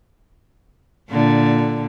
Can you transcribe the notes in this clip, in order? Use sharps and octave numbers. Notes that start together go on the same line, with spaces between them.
A#2 D3